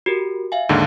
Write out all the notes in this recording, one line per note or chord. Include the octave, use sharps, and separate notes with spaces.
F#4 G4 A#4
E5 F5 G#5
D#2 G#2 D3